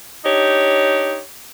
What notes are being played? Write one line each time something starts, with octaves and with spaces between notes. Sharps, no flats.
D4 D#4 G4 C#5